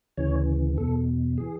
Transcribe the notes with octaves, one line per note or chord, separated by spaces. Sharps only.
D2 C#3 E3 C#5
E2 B2 A4
E3 G#4